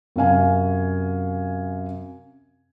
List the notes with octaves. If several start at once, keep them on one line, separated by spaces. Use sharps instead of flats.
F#2 C3 F5 G#5